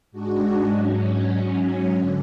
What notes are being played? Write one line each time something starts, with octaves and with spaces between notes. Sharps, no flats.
G#2 G#3 D4 F#4
G#2 F#3 C#4
G#2 F#3 C#4
D3